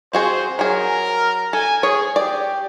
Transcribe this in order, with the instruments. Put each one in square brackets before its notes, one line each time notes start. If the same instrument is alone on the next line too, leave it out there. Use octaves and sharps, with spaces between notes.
[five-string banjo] C4 F#4 G#4 [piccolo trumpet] C5
[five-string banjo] F#3 G#4 [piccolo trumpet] A#4
[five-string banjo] A4 [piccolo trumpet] G#5
[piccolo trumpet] G#4 [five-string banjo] C#5
[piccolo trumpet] G4 [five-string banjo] D5